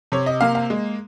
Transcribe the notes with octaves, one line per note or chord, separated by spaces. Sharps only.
C3 C#5
D#5
A#3 F5
F5
G#3